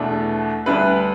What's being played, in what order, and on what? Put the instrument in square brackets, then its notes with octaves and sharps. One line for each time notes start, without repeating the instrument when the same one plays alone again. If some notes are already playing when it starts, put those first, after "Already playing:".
Already playing: [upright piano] E2 B2 A3 D4
D2 D3 G3 D4 B4